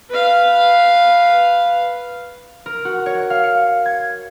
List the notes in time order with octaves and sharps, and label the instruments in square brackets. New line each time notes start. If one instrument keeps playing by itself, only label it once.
[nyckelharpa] B4 F5
[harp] A#4
F#4
C#5
F5
C#7
G#6